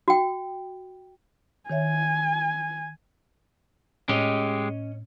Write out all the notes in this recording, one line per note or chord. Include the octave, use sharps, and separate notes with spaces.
F#4 G5
D#3 C#5 E5 G#5
A2 G#3 C#4 G4 C#5 D#5